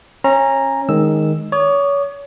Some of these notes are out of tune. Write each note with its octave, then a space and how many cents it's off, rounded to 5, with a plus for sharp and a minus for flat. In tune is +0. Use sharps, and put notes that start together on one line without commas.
C#4 -25 A#5 +0
D#3 +0 G#3 +0 E6 +0
C#5 +30 D#6 -45